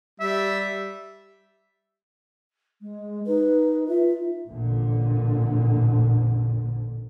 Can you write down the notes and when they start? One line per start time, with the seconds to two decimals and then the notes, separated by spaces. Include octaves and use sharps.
0.20 G3 E5
2.81 G#3
3.27 D#4 B4
3.88 F4 E5
4.47 A1 F2 A#2 D3